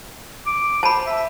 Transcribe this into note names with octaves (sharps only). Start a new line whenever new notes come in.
D6
C5 A5 B5
E5